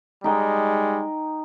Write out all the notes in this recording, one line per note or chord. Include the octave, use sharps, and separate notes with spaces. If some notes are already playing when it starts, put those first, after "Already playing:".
G3 G#3 D#4 G5